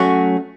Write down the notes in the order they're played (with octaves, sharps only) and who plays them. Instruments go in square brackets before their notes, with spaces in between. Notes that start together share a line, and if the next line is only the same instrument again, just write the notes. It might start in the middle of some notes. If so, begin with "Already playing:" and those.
Already playing: [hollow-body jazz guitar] F#3 A3 C#4 F#4